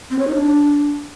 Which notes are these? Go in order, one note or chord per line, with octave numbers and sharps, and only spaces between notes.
C4
C#5
D#4
D4